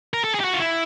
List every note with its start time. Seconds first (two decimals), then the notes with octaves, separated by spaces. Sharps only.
0.14 A#4
0.24 A4
0.34 G#4
0.40 G4
0.44 F#4
0.54 F4
0.60 E4